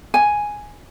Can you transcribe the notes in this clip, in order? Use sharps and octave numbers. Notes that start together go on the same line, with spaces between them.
G#5